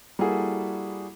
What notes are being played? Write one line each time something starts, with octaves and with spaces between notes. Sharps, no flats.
G3 A#3 E4 F#4 G#4 A4